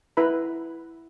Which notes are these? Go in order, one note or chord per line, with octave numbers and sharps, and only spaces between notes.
E4 B4 A#5 B5